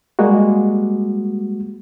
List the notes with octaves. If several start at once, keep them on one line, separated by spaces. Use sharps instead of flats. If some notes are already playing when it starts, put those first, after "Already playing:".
G3 G#3 A#3 F#4